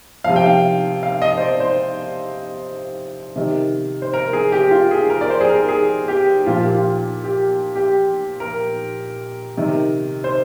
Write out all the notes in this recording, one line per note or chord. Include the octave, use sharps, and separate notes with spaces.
C3 F3 F5
G5
F5
F5
D#5
C5
D5
C5
C3 D#3
C5
A#4
G#4
G4
F4
G#4
A#4
D5
C5
G#4
A#4
G#4
G4
A#2 F3 F4
G4
F4
G4
G4
A#4
C3 D#3
C5